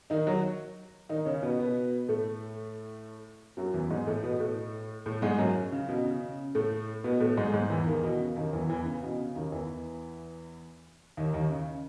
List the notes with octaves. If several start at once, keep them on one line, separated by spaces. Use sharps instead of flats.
D#3 D#4
F#3 F#4
D#3 D#4
C#3 C#4
B2 B3
B2 B3
A2 A3
F#2 F#3
E2 E3
G#2 G#3
A2 A3
B2 B3
A2 A3
A2 A3
G#2 G#3
F#2 F#3
C#3
B2
C#3
A2 A3
B2 B3
A2 A3
G#2 G#3
G#2 G#3
E2 E3
D#2 D#3
B2
C#3
D#2 D#3
E2 E3
E2 E3
C#3
B2
C#3
D#2 D#3
E2 E3
D#2 D#3
D#2 D#3
C#3